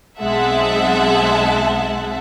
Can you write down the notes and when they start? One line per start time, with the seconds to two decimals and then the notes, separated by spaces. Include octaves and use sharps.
0.21 B1 G#3 C4 E5 F#5 A5